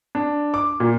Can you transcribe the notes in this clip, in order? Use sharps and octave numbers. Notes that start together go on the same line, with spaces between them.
D4
D6
A#2